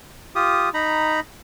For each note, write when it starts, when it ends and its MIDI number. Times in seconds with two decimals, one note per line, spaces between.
0.35 0.69 65
0.35 0.69 67
0.35 0.69 87
0.74 1.20 63
0.74 1.20 82
0.74 1.20 83